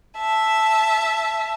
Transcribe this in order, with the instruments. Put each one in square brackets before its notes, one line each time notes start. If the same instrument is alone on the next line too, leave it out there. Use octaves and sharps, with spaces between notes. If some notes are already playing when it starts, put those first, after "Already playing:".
[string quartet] E5 A5